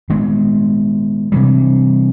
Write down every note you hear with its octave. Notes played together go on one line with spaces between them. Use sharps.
D#3 G#3 B3
C3 E3 G3